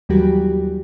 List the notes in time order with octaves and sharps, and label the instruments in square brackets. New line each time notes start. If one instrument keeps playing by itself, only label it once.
[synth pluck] D#2 E3 F#3 G3 F#4 G4